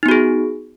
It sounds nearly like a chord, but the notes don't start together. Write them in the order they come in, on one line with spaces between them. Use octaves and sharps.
D#4 B3 F#4 G#4